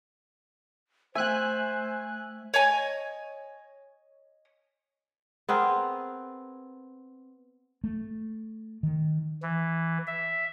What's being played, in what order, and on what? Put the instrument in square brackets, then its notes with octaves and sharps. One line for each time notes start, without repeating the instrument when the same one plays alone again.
[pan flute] A3 [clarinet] C5 [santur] E5 G5 [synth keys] G#5 F#6
[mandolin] C#5 D#5 G#5
[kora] B3 C4 G#4 A#4
[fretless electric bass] A3
D#3
[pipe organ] E3
E5